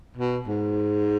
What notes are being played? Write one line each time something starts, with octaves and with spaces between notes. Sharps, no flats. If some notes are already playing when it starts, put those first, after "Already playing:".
B2
G#2